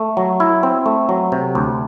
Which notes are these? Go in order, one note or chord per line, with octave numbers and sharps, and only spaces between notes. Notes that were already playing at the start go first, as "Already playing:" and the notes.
Already playing: A3
F#3
E4
C4
A3
F#3
C3
D2